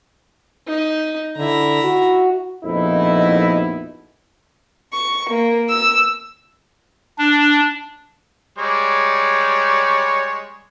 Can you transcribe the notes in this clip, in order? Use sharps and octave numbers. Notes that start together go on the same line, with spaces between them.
D#4
D3 E4 A#5
F#4
A#1 F2 B2 D#4 E4
C#6
A#3
E6
D4
G3 G#3 C#5